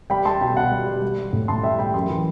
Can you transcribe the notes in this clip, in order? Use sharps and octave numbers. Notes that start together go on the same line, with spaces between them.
G3 G5 B5
G3 A5 C6
B2 G5 B5
B2 F#5 A5
G3
G3
G3
G3
A2
A2 A5 C6
G3 E5 G5
G3 G5 B5
F#2 C6
E3